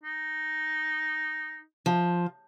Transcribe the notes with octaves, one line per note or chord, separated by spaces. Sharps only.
D#4
F3